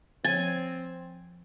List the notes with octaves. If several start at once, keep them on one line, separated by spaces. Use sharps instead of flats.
F3 C4 C#5 G#5 A6